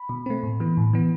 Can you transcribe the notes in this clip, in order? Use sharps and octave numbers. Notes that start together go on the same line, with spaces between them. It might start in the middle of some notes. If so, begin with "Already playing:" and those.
Already playing: B5
B2
A3 C4
A2
E3 B3
A2
E3 B3